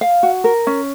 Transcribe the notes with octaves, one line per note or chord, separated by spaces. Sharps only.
F5
F#4
A#4
C#4